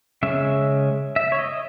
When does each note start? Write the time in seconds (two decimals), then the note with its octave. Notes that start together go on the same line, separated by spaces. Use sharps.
0.23 C#3 G#3 C#4 E5
1.16 E5
1.32 C#5
1.39 D#5